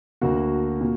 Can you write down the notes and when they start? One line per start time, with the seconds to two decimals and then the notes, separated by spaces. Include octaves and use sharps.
0.21 D2 D3 A#3 F#4
0.81 A#2 A#3